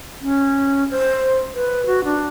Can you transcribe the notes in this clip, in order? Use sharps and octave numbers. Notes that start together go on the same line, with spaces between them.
C#4
C5
B4
F#4
D4